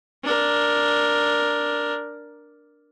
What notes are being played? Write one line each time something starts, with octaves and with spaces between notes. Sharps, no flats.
D4 A#4